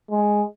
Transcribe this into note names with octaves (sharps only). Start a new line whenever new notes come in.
G#3